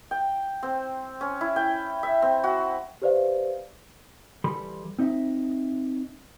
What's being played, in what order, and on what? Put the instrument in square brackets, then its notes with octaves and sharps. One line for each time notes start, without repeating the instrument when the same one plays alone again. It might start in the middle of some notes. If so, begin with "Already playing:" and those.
[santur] G5
C4
C#4
E4
G5
E5
C4
F#4
[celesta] G4 B4 C5 D5 E5 F5
[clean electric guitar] E3 G3 A4 B5 C6
C4 D#4 D#5 E5